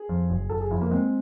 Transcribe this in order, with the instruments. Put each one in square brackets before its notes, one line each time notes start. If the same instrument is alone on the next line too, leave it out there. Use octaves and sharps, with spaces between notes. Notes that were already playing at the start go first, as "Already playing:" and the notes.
Already playing: [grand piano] G#4
[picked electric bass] F2
F#1
[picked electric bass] F#1 [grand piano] A4
[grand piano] G#4
[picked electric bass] F2 [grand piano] E4
[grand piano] A#3
[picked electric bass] G#3 [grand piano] C4